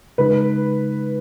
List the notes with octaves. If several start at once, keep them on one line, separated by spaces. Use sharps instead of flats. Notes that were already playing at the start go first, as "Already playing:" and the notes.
C#3 G#3 D#4 B4